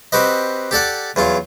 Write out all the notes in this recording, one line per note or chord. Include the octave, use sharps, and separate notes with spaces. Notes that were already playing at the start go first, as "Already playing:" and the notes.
C4 F#4 G4 B4 D#5
G4 A4 D5 F#5
E2 F#3 F4